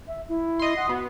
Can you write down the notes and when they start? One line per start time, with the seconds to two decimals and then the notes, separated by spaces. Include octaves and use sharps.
0.07 E5
0.29 E4
0.59 D#5 C6
0.76 F#5
0.89 B3 F#4